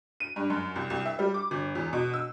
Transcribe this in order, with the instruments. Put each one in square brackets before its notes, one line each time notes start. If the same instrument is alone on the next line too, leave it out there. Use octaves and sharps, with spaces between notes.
[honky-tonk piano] D#7
G2
F#2
C2
C2
E5
G3
D6
G1
E2
B2
E6